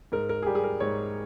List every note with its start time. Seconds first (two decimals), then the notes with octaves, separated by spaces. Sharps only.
0.12 G#2 A#4
0.29 A#4
0.42 G#4
0.46 G3 G4
0.55 G#4
0.64 A#4
0.80 G#2 C#5